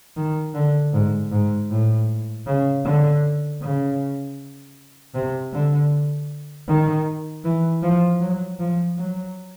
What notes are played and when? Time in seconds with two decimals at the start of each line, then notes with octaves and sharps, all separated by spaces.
0.17 D#3
0.55 D3
0.93 G#2
1.32 G#2
1.70 A2
2.47 C#3
2.84 D3
3.62 C#3
5.15 C3
5.53 D3
6.68 D#3
7.44 E3
7.82 F3
8.21 F#3
8.59 F3
8.97 F#3